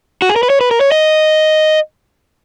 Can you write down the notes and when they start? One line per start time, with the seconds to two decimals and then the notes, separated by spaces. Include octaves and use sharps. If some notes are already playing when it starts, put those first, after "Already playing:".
0.22 F#4
0.29 G#4
0.36 A#4
0.43 B4
0.50 C#5
0.61 B4
0.71 A#4
0.81 C#5
0.92 D#5